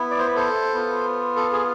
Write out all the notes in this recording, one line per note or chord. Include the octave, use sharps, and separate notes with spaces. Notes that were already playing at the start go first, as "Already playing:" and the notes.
Already playing: B3 E4
D5
C5
B4
A4 C5
B3 F4
A4
G#4